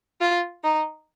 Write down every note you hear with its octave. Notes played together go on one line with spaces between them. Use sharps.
F4
D#4